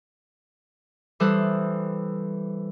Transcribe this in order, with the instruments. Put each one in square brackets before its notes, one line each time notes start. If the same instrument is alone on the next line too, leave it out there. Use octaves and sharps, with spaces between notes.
[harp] E3 G3 A4 C5 D#6 F#6